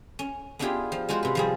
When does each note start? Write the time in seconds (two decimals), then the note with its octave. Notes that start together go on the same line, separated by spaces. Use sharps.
0.19 C#4
0.59 B3 D4 E4 F4 G4 G#4
0.92 F3
1.09 G#3 F4 F#4 C5
1.23 C3 B4
1.35 F3 G3 G#4